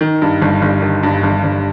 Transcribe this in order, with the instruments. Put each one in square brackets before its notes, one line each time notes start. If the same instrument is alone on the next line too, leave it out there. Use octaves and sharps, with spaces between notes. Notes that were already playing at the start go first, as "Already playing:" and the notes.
[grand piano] D#3
G2
G1
G1
D#3
G2
G1
G1